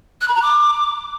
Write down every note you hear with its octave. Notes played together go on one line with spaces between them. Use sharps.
F#6
B5
A#5
D6